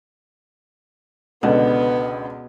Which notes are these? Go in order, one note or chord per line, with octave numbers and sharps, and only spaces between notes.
C#2 B2 D3 B3